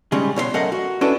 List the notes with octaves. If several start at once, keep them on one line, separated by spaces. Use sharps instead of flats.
C#3 G3 G#3 C#4
B2 C#5 D#5 C6
F#2 A3 A#4 D#5 F5 F#5
F#4
C#4 D4 E4 F#4 A4 B4